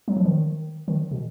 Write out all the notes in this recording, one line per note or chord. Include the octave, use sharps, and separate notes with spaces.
F#3
F3
D#3
D#3
B2